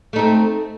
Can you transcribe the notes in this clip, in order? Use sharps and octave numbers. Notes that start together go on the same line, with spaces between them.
A3 C4 D#4